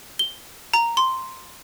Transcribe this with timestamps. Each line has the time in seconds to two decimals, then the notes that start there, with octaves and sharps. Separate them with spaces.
0.19 G7
0.73 A#5
0.97 C6